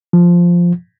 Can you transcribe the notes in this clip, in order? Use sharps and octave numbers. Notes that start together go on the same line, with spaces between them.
F3